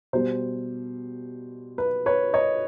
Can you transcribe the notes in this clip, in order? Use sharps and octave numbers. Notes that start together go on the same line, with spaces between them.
B2 G3 C5
B4
B4 C#5
C#5 D#5